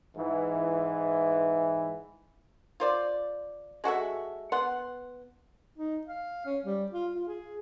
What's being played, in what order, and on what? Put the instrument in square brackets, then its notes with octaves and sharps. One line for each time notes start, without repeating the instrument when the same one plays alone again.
[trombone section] G#2 E3
[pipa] F4 C5 D5
G#3 F#4 A4 E5
B3 F#5 C6
[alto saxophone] D#4
F5
C#4
G3
F4
F4
G#4